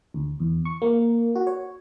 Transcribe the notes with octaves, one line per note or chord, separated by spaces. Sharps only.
D2
E2
C#6
A#3
F#4
C#5